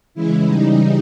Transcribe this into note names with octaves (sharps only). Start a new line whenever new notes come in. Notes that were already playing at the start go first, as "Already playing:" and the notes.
C#3 E3 G#3 E4
C#3 E3 G3 D#4